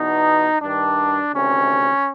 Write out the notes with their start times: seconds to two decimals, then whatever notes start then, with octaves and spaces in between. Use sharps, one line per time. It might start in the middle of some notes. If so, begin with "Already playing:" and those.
Already playing: E2 B2 D#4
0.62 G2 D#3 D4
1.34 D2 C3 D#3 C#4